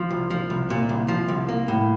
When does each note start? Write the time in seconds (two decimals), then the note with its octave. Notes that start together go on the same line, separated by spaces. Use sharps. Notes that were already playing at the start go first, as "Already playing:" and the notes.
Already playing: F3
0.11 C2
0.30 F3
0.50 C2
0.70 A#2
0.89 C2
1.08 F3
1.28 C2
1.48 A#3
1.68 A2